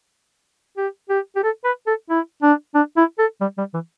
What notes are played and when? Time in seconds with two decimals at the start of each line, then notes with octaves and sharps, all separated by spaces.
0.77 G4
1.09 G4
1.36 G4
1.43 A4
1.64 B4
1.86 A4
2.10 E4
2.42 D4
2.75 D4
2.97 E4
3.19 A4
3.41 G3
3.58 G3
3.74 E3